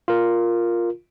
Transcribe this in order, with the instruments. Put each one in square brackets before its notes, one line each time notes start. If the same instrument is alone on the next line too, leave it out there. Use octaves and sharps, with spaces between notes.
[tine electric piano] F4 A#4